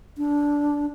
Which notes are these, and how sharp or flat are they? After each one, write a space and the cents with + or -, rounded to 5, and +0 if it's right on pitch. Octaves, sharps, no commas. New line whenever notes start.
D4 -10